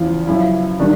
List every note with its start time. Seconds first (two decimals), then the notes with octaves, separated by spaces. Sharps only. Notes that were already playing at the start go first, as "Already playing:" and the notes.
Already playing: E2 C#3 F3 F4
0.27 F#2 C#3 F3 E4
0.79 D#3 G3 D4